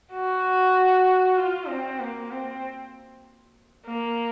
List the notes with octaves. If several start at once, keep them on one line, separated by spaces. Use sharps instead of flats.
F#4
F4
C4
A#3
C4
A#3